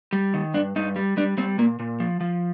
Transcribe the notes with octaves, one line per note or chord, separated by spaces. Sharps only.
G3
D#3
G2 D4
G2 D#4
G3
G3 D4
G3 C4
A#2 A#3
A#2
F3
F3